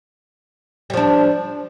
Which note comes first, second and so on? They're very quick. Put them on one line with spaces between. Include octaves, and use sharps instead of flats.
G3 F3 D4